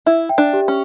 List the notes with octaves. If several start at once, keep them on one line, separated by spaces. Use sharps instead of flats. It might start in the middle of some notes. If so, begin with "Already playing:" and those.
E4 E5
G5
D4
G4
C#4